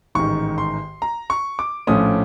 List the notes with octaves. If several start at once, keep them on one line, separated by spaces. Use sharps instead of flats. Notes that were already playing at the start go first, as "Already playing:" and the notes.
A1 G#2 D#3 C#6
C6
A#5
C#6
D6
A#1 A2 F3 A3 C#4 D#6